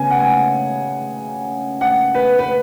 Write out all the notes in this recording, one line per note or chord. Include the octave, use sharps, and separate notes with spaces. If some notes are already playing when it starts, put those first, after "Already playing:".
Already playing: C#3 B3 G#5
F#5
G#5
F#5
F#5
B4
B4